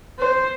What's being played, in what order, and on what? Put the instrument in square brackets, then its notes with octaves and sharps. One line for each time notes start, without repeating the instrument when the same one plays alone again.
[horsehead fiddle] C5